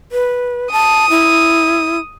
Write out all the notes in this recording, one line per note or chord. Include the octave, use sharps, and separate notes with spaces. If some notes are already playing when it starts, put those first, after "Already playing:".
B4
A5 D#6
E4